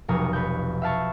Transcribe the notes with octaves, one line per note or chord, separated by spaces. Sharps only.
F1 B1 A#4 C#5 D#6
B4 C#5 G6
E5 F5 A5 C#6